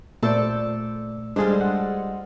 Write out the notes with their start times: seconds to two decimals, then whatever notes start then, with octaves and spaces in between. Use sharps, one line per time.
0.23 A#2 A3 A4 C5 D5 E6
1.36 G3 G#3 D4 F4 G#4 A4 C5
1.61 F#5